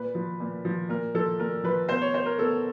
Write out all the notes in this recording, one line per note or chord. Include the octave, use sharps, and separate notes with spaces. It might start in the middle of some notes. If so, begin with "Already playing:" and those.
Already playing: A#2 B4
F3
A#2
F3
A#2 A#4
F3 A4
A#2 A#4
F3 B4
B2 C5
C#5
C5
A#4
B2 A4